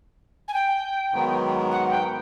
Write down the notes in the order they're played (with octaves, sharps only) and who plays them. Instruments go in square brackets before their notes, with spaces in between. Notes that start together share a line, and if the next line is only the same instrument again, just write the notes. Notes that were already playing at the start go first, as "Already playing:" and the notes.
[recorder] G#5
G5
[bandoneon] G#2 D#3 F#3 B3
[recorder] F#5
G5